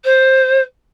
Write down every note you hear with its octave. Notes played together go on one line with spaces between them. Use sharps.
C5